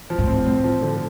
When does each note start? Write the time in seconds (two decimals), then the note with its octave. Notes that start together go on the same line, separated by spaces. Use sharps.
0.10 F3
0.19 A2
0.27 C4
0.46 A2 C4
0.64 F3
0.82 D3